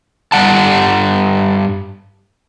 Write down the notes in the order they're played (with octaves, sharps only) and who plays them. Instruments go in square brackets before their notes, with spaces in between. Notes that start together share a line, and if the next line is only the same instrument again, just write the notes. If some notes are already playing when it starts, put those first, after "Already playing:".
[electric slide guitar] G2 G3 F#5 A5